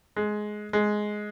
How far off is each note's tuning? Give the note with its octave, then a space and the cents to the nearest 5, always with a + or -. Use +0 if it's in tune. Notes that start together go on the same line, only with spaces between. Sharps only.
G#3 +15
G#3 +10